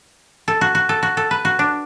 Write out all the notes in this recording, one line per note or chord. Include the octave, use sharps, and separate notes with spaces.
A4
F#4
F#4
A4
F#4
A4
B4
F#4
D4